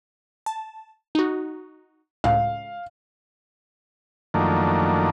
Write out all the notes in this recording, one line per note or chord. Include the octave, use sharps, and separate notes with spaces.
A5
D#4 F#4
C#2 A2 F5
F#2 D#3 F3 A3 A#3 D4